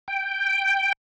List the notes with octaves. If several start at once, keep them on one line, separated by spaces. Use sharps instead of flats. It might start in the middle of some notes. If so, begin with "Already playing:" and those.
G5